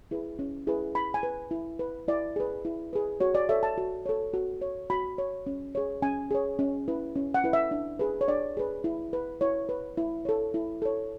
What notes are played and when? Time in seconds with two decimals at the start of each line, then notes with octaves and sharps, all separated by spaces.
0.11 E4 G#4 B4
0.39 C#4
0.67 E4 G#4 B4
0.95 E4 B5
1.14 G#5
1.23 B4
1.51 E4
1.79 B4
2.08 E4 D5
2.36 G#4 B4
2.65 E4
2.93 G#4 B4
3.20 F#4 C#5
3.35 D5
3.49 A4 C#5 E5
3.63 A5
3.78 F#4
4.06 A4 C#5
4.34 F#4
4.61 C#5
4.90 F#4 B5
5.18 C#5
5.47 C#4
5.75 G#4 C#5
6.02 C#4 G#5
6.31 G#4 C#5
6.59 C#4
6.88 E4 B4
7.16 C#4
7.34 F#5
7.44 E4 B4
7.53 E5
7.71 D4
7.99 G#4 B4
8.21 C#5
8.28 D4 D5
8.57 G#4 B4
8.84 E4
9.13 B4
9.41 E4 C#5
9.69 B4
9.97 E4
10.25 A4 C#5
10.54 E4
10.82 A4 C#5